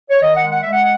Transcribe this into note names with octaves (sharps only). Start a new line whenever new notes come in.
C#5
D#3 D#5
F#5
G#3
F#5
G#3 E5
F#5